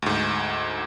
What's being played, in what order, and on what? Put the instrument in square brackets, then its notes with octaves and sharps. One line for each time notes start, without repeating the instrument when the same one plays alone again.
[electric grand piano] D2 G#2